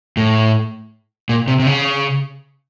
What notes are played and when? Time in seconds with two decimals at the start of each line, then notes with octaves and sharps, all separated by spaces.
0.17 A2
1.29 A#2
1.48 C3
1.60 C3
1.67 C#3